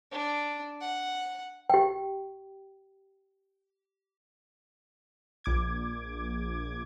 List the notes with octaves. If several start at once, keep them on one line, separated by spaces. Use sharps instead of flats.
D4
F#5
G4 G5
A#1 D6 G#6